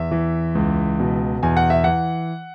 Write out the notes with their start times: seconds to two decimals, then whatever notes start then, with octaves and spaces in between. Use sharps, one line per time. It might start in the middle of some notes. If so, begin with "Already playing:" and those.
Already playing: E2 E5
0.11 E3
0.55 C#2
1.00 B2
1.43 E2 G#5
1.57 F#5
1.70 E5
1.84 E3 F#5